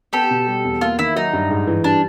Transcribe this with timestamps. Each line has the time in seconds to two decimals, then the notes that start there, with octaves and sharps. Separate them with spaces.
0.13 B3 G4 A4
0.31 B2
0.48 G3
0.64 E2
0.81 A#3 F4
0.99 D#3 E4
1.16 F#3 D#4
1.33 G2
1.50 G#2
1.67 E3
1.84 G3 D4